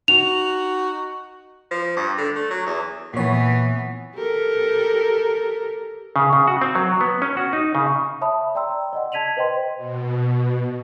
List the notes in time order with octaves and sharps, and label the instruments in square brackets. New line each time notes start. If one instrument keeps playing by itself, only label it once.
[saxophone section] D#4 F#4 [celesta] F7
[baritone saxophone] F3
G2
D3
A3
F#3
E2
[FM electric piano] A#2 C#5 [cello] E3 B3
[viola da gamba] G4 A4 A#4
[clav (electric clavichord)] C#3
C#3
F#4
C4
F#3
B3
C#4
F#4
D#4
C#3
[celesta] C#5 E5 A5 B5 D#6
D5 G5 A#5 C6 E6
D5 D#5 F#5
A5 G#6 B6 D#7 F7 F#7
B4 C5 D#5 G5 C6
[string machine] B2